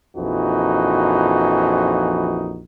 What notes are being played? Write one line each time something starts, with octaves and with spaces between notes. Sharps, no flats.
A#1 F2 E3 D#4 F#4